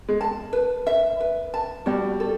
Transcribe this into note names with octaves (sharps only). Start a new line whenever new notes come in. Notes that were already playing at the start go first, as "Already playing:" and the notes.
G#3
A5
B4
E5
B4
A5
G3 F#4
A4